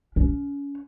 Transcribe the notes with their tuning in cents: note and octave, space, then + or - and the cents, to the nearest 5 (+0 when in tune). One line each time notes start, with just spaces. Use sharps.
C#4 +30